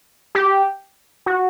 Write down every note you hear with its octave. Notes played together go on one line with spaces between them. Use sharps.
G4
F#4